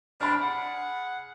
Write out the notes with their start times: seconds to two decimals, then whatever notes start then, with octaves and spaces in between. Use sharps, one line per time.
0.21 G3 C4 D4 B5 F6
0.42 G#4 F#5